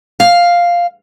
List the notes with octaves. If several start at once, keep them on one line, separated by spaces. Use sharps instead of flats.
F5